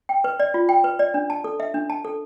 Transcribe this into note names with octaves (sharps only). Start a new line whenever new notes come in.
G5
B4
D5
F4
G5
B4
D5
D4
A5
A4
E5
D4
A5
A4